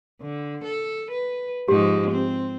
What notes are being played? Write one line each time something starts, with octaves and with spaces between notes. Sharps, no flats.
D3
A4
B4
G#2 F3 D#4 G4
C4